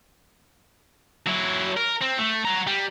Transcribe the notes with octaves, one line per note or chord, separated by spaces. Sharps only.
F#3 E4
A#4
C4
A3
F#4 A#5
G3